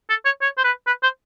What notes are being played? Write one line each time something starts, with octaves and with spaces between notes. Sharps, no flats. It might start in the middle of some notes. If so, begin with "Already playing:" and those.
A4
C#5
C#5
C5
B4
B4
C5